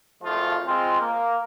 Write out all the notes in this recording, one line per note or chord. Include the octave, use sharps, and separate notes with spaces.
G#1 F3 A3 F4
G#3 C4 F4
A#3